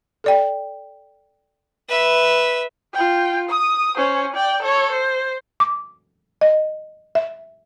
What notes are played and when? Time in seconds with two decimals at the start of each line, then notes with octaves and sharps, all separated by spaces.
0.24 A4 D5 G5
1.89 B4 E5
2.94 F4 G5
3.49 D#6
3.97 C#4 C5
4.34 D5 G5
4.63 A4 C#5
4.92 C5
5.60 D6
6.41 D#5
7.15 E5